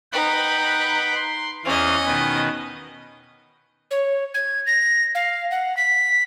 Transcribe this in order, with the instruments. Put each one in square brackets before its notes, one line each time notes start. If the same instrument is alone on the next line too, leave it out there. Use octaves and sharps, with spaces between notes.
[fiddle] D#4 B4 [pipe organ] F#5 G5 B5
[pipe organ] C6
[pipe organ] E2 E3 F5 [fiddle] C#4 D#5
[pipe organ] B2 D#3 B4
[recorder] C#5
G#6
A#6
F5
F#5
B6